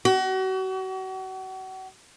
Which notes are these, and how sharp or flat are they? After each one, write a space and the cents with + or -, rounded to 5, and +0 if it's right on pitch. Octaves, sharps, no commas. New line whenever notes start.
F#4 +35